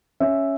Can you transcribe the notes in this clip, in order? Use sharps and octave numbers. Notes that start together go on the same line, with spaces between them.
C#4 E5